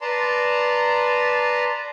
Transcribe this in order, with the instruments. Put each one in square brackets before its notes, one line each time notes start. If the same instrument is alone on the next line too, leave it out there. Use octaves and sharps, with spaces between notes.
[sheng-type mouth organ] B4 D5 A5 A#5 C6